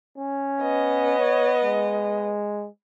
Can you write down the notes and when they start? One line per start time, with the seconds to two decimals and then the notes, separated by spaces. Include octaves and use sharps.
0.18 C#4
0.61 B3 D#5
1.19 C#5
1.64 G#3